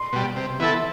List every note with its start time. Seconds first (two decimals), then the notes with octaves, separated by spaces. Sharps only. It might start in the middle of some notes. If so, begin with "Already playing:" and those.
Already playing: C6
0.13 B2 G3
0.36 C3
0.60 E3 B3 E4 A4